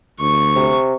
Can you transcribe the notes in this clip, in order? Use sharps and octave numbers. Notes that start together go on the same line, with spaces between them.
D2 C#6
C3